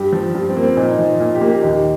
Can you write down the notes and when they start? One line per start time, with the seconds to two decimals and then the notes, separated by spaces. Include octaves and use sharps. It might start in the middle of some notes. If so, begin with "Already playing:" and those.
Already playing: G2 G4
0.13 F3
0.35 G2 F4
0.49 C4
0.57 A#3
0.63 C4
0.77 A#2 D#4
0.91 D#4
0.99 F3
1.20 A#2 F4
1.35 G4
1.41 A#3
1.48 G4
1.63 D#2 D#4